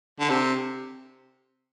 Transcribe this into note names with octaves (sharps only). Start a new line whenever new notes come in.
D3
C3